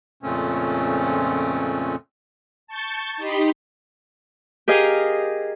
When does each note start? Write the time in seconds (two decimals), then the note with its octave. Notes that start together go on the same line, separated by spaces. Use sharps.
0.23 F2 A#2 C#3 A3 C4 C#4
2.67 A5 C#6 G6 A6
3.17 D#4 G4 D#5 B5 C6
4.68 G4 G#4 A#4 D#5 F5